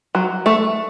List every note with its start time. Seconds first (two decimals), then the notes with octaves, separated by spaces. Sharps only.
0.15 F#3
0.46 A3